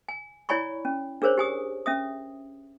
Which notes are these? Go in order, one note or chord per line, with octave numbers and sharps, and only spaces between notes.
G#5
E4 C#5 D5 G#5 B5 C#6
C#4
D4 G#4 A#4 C5 C#5
G4 G#5 D#6
C#4 E5 D#6